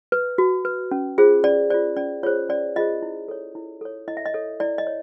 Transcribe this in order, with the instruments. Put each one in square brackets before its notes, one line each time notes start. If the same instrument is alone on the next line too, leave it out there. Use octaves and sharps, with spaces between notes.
[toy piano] B4
F#4
B4
C#4
F4 G#4 C5
C#4 D5
F4 G#4 C5 D5
C#4 D5
F4 G#4 C5 C#5
C#4 D5
F4 G#4 C5 D#5
E4
A4 C#5
E4
A4 C#5
E4 D#5
E5
D#5
A4 C#5
E4 D5
D#5
C#5